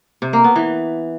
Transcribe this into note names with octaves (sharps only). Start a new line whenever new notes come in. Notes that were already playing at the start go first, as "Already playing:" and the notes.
C3
A#3
B3
E3